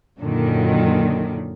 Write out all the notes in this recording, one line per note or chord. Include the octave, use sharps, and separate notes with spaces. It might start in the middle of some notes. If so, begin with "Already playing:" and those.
F#2 A#2 D3 D#3